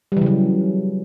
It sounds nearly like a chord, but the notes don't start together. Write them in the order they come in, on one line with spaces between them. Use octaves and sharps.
G3 E3 C#3 F#3